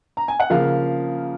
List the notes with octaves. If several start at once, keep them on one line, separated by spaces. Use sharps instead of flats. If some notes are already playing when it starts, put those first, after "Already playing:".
A#5
G#5
F#5
C#3 F3 A#3 F5